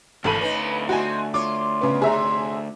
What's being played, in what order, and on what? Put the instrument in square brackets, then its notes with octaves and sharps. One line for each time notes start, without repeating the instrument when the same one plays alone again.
[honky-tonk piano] G#1 A4 D#7 [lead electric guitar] D2 B5 [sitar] E3
[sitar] C#4 D#4 [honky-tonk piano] B4
[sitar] C4 D#4 [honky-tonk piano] F#4 G#5
[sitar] F4 C#5 [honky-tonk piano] D6
[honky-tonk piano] C#3 B3
[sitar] G#2 C3 [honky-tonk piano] G#4 E5 A#5